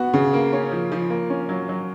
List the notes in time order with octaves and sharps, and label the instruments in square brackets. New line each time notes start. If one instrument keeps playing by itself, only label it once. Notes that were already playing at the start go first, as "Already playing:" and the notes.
Already playing: [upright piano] B3 F#4
C#3
A#3
C#4
F3
F3
A#3
C#4
F#3
F#3